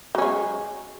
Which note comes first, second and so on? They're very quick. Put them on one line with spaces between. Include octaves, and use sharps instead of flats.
F#3 C#4 G#3